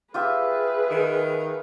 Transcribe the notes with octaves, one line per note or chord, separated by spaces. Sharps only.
F4 G4 G#4 B4 E5
D#3